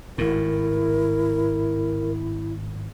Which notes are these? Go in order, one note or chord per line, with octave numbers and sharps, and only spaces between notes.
G#1 A2 E4 A#4